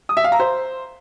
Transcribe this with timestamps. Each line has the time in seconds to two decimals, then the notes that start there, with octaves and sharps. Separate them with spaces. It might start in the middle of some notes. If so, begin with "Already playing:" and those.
0.09 D#6
0.17 E5
0.24 F5
0.32 A#5
0.40 C5